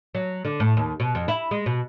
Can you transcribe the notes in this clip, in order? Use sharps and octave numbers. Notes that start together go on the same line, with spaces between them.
F#3
D3
A2
D#2
B2
F2
E4
G#3
B2